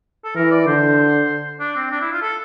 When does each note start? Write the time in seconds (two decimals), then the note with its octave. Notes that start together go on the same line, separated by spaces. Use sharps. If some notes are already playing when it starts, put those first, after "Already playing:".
0.24 A4
0.36 E3 A#4
0.51 D5
0.67 D3 C5
1.60 D4
1.76 C4
1.91 D4
2.01 E4
2.12 F4
2.22 A4